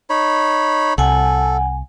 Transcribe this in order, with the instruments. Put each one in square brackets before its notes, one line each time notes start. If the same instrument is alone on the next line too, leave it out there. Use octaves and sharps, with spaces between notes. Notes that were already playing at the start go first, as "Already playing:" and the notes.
[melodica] D#4 C#5 B5
[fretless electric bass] C2 [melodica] A4 [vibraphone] F#5 G#5